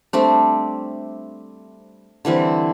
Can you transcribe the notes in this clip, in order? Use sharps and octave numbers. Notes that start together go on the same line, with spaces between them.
G3 A3 C4 D4
D3 E3 G3 C4